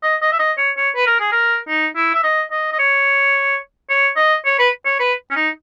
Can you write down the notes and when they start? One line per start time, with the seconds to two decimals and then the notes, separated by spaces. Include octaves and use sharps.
0.03 D#5
0.22 D#5
0.32 E5
0.39 D#5
0.58 C#5
0.77 C#5
0.96 B4
1.07 A#4
1.20 G#4
1.32 A#4
1.68 D#4
1.96 E4
2.14 E5
2.23 D#5
2.51 D#5
2.72 D#5
2.79 C#5
3.90 C#5
4.17 D#5
4.45 C#5
4.59 B4
4.86 C#5
5.00 B4
5.31 C#4
5.36 D#4